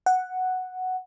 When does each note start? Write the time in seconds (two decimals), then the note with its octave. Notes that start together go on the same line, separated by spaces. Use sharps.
0.06 F#5